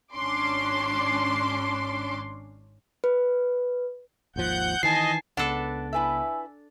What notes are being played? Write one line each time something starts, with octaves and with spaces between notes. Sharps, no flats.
G#1 C#4 D4 C6 D6
B4
G#1 D#2 F3 F#5 G6
D#3 E3 D#5 G#5 A5 C7
C#2 C#3 B3 D4 A4 B4 F#5
E4 B4 E5 G#5 E6